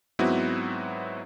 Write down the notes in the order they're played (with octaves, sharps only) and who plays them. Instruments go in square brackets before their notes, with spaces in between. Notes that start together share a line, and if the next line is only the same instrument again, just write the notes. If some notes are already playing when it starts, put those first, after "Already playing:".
[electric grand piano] G#2 F#3 B3 C4 E4 F#4